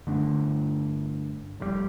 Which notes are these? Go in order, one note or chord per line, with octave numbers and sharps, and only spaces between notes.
G2 D3 A3 D4
F1 F2 C3 G3